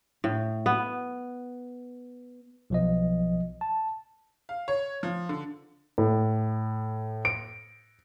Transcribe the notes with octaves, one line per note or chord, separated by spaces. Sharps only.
A2
B3
B1 F3 D#5
A5
F5
C#5
F3
D3
A2
D7